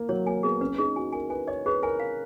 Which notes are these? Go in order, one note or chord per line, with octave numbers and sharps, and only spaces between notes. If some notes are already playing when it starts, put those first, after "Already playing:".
Already playing: A#3
F#3 C#5
A#3 G#5
B3 G#4
C#4 B4
D#4 G#4
F#4 G#5
A#4 G#5
B4 G#5
C#5 D#5
G#4 B4
A#4 G#5
F5